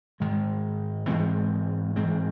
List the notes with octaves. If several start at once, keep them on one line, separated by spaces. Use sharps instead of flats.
G#2 D#3 G#3
G#2 E3 G#3 C4
G#2 E3 G#3 C4